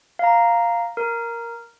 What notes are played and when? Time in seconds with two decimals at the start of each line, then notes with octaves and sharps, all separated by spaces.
0.19 F5 A#5
0.97 A#4